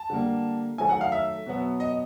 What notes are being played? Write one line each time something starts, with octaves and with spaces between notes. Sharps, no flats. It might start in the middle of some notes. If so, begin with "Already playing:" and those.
Already playing: A5
D3 G3 A#3
D#3 F#3 A3 G#5
F#5
F5
E5
B2 F#3 B3
D#5